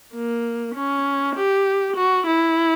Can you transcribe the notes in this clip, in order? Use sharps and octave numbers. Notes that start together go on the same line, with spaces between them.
A#3
C#4
G4
F#4
E4